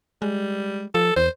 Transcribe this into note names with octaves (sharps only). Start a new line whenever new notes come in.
G3 G#3
F3 A4
E2 C5